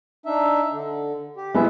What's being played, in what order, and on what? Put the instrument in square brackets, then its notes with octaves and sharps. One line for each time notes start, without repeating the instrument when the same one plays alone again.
[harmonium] D4 D#4 E5
D3
G4
[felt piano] G#3 B3 E4 [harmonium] E5